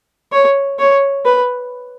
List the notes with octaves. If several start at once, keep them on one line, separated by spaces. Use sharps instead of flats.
C#5
C#5
B4